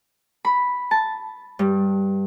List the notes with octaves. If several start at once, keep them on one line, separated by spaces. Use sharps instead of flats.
B5
A5
G2